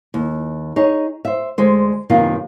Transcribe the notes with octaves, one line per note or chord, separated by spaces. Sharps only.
D#2
D#4 G#4 C#5
C5 E5
D2 G#3 C5
F#2 C3 D#3 A#3 B3 F4